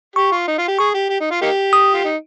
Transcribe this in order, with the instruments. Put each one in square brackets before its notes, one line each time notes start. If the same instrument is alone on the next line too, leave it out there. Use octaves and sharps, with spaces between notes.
[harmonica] G4 [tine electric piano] C#6
[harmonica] F4
D#4
F4
G4
[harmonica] G#4 [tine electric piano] C#6
[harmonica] G4
G4
D#4
F4
A#3 D#4 G4
[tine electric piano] D#6
[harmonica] F4
D#4